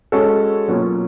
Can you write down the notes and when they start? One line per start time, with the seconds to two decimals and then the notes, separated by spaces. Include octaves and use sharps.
0.12 G#3 C#4 F#4 A4
0.68 B2 F#3 A#3 C#4 F4